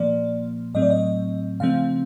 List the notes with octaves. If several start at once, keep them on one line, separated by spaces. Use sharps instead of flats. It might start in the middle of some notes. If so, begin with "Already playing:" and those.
Already playing: A#2 F3 A#3 D5
A2 F#3 A3 C4 D#5
D5
D#5
C#3 F3 A3 C4 F5